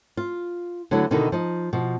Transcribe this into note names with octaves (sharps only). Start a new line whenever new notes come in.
F4
D3 F#3 A3 B3 E4
B2 D3 D#3 D#4 E4 F#4
F3 D#4
B2 F3